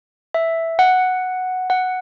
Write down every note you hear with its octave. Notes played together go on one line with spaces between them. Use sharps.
E5
F#5
F#5